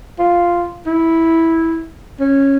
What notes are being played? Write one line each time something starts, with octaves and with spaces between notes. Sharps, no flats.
F4
E4
C#4